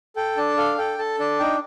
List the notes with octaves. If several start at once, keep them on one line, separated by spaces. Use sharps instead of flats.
A4 G5
D4 A5
A4 F5
A4 G5
A4 A5
D4 A5
D#4 G5